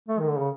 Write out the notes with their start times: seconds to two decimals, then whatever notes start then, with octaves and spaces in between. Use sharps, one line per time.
0.09 A3
0.20 D#3
0.29 D3
0.39 C#3